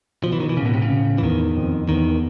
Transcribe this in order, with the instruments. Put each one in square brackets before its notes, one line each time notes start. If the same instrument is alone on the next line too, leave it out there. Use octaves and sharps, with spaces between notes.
[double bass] B2 [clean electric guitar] F3
[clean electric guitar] E3
D#3
E3
[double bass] A2 [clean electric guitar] C#3
[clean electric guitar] B2
C3
C#3
[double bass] A2
[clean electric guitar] E3
[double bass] E2 [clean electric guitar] D#3
[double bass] F2
[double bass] E2 [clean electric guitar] D#3